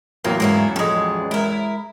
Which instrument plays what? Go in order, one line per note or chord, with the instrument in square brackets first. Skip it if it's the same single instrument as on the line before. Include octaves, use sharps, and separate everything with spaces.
[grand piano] A1 E2 F#3 [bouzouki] A#3
[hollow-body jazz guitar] G#2 G#3 [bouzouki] A#3 C#4 E4
[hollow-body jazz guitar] F3 C#4 A4 [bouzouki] G3 G#3
[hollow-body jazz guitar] G#3 [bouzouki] E4 A#4